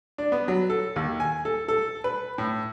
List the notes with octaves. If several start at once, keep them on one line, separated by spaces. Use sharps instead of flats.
D4
B3
F#3
A4
D#2
G#5
A4
A4
B4
A2